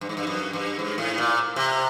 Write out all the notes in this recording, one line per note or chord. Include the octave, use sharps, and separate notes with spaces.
G2
G#2
G2
F#2
G2
G#2
A2
A#2
C3